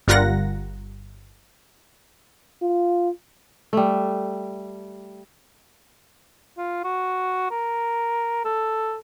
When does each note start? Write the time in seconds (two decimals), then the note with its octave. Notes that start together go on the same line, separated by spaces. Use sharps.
0.08 G1 G3 F4 A#4 F#5 A#6
2.63 F4
3.73 G3 A3
6.58 F4
6.84 F#4
7.51 A#4
8.45 A4